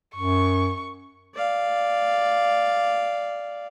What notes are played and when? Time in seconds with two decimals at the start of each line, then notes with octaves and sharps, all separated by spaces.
0.16 F#2 C#6
1.34 D5 F5